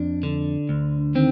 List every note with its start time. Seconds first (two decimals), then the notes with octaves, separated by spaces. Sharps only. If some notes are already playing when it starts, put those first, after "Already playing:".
Already playing: F2 D4
0.23 D3
0.69 D2
1.15 D#3 C4